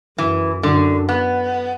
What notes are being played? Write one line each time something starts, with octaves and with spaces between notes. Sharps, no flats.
F#2 E3
F#2 D3
B3